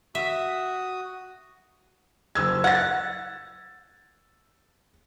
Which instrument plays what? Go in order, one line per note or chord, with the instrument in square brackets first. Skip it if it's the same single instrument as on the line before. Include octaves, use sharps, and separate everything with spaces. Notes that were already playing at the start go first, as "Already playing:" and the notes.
[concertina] F#4 D#6 [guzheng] E5
[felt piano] F#1 E6 G#6
[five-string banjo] F#5 [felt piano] G#6 A6